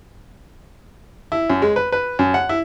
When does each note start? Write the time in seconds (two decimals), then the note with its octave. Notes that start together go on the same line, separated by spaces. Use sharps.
1.32 E4
1.50 F#2
1.62 G#3
1.76 B4
1.92 B4
2.19 F#2
2.34 F#5
2.49 E4